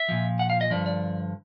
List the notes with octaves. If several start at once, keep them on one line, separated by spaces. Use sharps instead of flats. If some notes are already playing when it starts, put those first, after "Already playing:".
Already playing: E5
A#2 F3
F#5
F5
D#5
G2 D3 F3 D5
D5